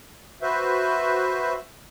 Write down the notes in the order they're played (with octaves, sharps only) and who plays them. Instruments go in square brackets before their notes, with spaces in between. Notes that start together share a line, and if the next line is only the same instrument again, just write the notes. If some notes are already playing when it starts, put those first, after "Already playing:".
[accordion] F#4 B4 C5 E5